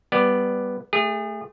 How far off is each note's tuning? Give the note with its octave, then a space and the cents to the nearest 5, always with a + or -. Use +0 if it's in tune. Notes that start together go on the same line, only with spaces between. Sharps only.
G3 +0 B3 +0 D5 +10
A3 +0 G#4 -35